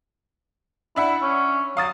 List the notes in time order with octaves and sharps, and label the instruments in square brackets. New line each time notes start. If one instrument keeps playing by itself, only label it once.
[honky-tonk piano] D4 E5 F#5 [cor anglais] E4
[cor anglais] C#4
[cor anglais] F#3 [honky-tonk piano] F5 D#6 A6